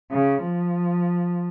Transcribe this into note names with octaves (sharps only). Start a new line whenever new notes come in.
C#3
F3